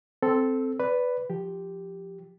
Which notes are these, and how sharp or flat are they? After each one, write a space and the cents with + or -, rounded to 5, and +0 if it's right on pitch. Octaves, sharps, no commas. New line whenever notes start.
C4 -5 A4 +0
B4 +5 D5 -15 B5 +5
F3 +0 G4 +0